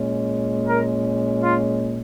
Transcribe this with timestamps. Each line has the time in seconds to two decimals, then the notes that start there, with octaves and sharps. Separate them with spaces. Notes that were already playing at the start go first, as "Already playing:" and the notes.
Already playing: A#2 G#3 C#4
0.69 A#4
1.43 F4